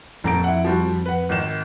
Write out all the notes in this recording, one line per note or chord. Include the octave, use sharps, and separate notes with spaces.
D#1 F2 A#5 D7
E4 F#5
F3 G3 F#4
B4 F#5
G#1 D#3 E7